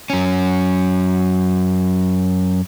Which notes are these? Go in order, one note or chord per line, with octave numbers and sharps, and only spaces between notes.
F#2 C#4